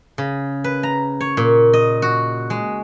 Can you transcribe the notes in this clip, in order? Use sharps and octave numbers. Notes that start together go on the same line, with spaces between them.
C#3
B4
A#5
C#5
A#2
D#5
F#4
G#3